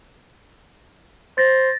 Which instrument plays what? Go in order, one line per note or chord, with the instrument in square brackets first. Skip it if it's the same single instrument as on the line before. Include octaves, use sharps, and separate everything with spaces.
[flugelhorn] C5 [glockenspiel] A6 A#6